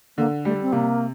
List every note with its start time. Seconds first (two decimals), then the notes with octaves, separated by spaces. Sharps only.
0.18 D3 A#3
0.45 G3 A3
0.62 C4
0.73 C3 A#3